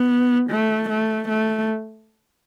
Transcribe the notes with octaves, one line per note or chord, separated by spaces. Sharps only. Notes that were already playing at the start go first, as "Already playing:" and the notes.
Already playing: B3
A3
A3
A3